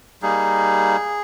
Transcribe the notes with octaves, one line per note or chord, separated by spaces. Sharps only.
G3 A#3 D#4 G#4